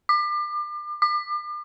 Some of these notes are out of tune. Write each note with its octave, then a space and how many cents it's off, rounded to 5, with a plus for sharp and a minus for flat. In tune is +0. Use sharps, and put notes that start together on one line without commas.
D6 +35
D6 +40